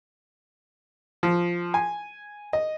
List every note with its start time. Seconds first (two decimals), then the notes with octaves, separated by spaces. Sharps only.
1.23 F3
1.74 G#5
2.53 D#5